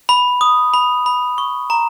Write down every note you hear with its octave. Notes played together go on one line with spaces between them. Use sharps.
B5
D#6
B5
B5
C#6
A#5